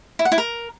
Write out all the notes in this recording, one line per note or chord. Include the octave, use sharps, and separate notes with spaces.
E4
F#5
E4
A#4